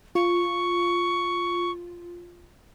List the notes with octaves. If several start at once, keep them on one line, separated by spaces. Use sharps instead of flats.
F4 C#6